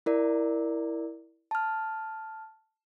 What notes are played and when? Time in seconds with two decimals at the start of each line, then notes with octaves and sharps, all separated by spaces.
0.06 E4 A#4 D5
1.51 A5 F6